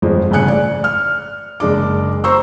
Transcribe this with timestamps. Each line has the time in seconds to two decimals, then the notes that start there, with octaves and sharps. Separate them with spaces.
0.02 G1 F2 G#3
0.31 G1 A2 C#3 G#5 F#6 C#7
0.48 D5
0.84 F6
1.60 F#1 G#3 D4 D6
2.24 C5 A#5 C#6 E6